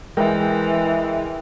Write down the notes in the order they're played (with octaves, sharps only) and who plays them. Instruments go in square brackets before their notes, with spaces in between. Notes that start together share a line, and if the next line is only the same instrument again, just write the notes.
[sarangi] E3 [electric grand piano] G#3 A#4 G5